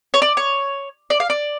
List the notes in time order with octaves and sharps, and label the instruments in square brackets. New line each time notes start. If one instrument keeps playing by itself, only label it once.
[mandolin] C#5
D5
C#5
D5
F5
D5